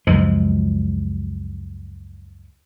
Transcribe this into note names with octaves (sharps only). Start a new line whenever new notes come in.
C#2 F#2 F3 G#3